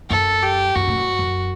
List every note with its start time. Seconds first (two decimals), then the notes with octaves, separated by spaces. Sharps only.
0.10 F#2 A4
0.43 G4
0.75 F#2 F#4
0.87 A2
0.97 G2
1.19 F#2